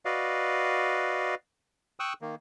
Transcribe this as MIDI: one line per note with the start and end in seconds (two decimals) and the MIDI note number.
0.05 1.35 66
0.05 1.35 71
0.05 1.35 74
0.05 1.35 75
0.05 1.35 77
2.00 2.13 79
2.00 2.13 85
2.00 2.13 87
2.00 2.13 88
2.00 2.13 90
2.22 2.35 51
2.22 2.35 58